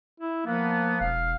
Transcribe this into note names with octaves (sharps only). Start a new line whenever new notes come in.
E4
F3 A#3 B3
E1 F5